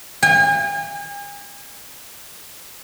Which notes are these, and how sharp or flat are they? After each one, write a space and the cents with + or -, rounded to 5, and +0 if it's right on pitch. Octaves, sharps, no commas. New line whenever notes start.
G#5 -40